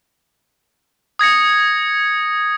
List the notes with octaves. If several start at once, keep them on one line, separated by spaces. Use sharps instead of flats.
D#6 G#6 A#6 C#7